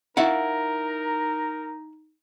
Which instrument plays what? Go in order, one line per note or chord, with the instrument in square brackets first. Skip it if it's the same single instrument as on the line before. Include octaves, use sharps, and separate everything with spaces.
[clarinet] D#4 [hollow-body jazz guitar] E4 F5 F#5 [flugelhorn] A#4